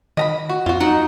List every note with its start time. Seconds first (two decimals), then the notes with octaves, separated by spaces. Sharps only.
0.17 D#3 D#5 A#5 B5
0.49 F#4
0.66 F2 F4 F#4
0.80 F#3 D#4 F#5